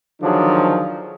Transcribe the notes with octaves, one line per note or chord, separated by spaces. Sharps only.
D3 D#3 F3 F#3 D4 G#4